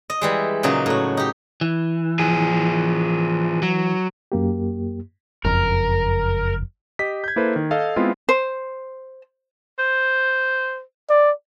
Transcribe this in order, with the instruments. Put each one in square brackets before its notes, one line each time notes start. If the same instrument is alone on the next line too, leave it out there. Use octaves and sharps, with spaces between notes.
[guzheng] D#5
E3 G3 G#3
A#2 C#3 F#3 D#4
A2 F#4
D#4 G4
[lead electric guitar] E3
[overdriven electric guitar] F3 G#4
F#3
[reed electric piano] F#2 A#3 G4
[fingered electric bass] F#1 F2 [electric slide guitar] A#4
[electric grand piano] G4 D#5 B6
G6 G#6
A#3 E4 A4 B4 C5
D#3
A4 D#5 F5
G#3 B3 C4 E4 F4
[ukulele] C5
[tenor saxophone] C5
[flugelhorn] D5